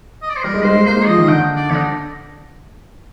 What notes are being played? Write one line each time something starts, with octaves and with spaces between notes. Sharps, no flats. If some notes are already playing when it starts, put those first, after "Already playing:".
D#5
D5
C5
G3 A#4
G#3
G#3 C5
G#3
A#3 C5
G#3
F3 D#5
D#3
D3 G5
D5
D3 G4
D#4